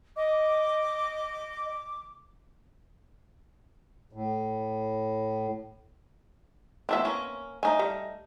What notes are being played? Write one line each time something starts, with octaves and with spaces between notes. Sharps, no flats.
D#5 D6
A2
E3 A3 B3 C4 E5
A#3 C#4
A3 D#4 G#5
G3